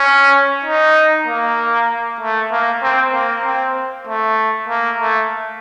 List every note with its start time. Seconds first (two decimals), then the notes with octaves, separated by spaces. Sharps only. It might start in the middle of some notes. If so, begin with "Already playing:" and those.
Already playing: C#4
0.65 D#4
1.26 A#3
2.21 A3
2.52 A#3
2.83 C4
3.13 A#3
3.44 C4
4.07 A3
4.69 A#3
5.00 A3